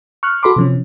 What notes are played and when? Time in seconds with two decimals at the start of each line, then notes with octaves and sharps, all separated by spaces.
0.23 C#6 F6 F#6
0.43 F#4 A4 B5 C6 D6
0.56 C3 F3 C#4